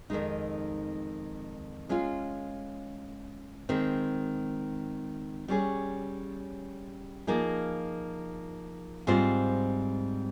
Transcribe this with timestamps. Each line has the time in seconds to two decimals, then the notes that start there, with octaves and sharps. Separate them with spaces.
0.10 F2 D#3 G#3 D#4
1.89 G#3 C#4 F4
3.69 D#3 G#3 C4
5.48 G3 C#4 G#4 C#5
7.27 F3 A#3 D#4 G#4
9.07 G#2 G3 C4 F4 C5